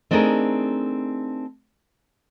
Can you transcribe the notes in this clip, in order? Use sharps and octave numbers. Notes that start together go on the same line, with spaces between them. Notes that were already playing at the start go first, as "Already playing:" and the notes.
A3 C4 D4 D#4 G#4 A#4